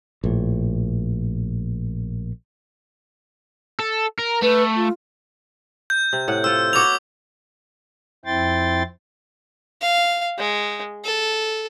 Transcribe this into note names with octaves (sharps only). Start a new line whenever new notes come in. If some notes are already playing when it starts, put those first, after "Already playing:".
A#1 A2
A4
A#4
A3 B4
F4
G6
C3
A2 F#5
F4 C5 E6
B3 F#4 C#5 D6 F7
F2 C4 E4 G5 C6 A6
F5
G#3
A4